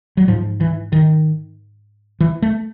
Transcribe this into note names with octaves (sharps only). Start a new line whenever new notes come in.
F#3
G#2 F3
E3
D#3
E3
A3